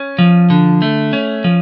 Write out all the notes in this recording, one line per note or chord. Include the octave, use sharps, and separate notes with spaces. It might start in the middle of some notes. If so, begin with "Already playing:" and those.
Already playing: C#4
F3
D3
A3
C#4
F3